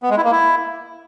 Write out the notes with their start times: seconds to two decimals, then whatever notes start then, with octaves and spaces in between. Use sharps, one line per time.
0.03 B3
0.10 G#3
0.17 E4
0.24 A#3
0.31 E4